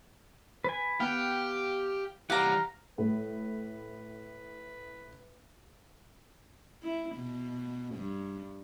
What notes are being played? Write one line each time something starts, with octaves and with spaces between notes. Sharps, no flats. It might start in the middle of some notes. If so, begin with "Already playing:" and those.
B4 G#5
B3 G4 F5 G5
E3 G3 G4 F5 F#5 A#5
A2 B4
E4
B2
G2